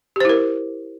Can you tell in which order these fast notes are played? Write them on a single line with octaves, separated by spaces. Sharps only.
G4 C5 E4 A#4